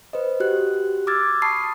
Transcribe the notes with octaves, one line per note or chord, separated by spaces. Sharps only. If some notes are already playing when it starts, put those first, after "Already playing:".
B4 C5 D#5
F#4 G4 F#6
D6 E6 F6 G#6 A6
A5 B5 C#6 D#6 C7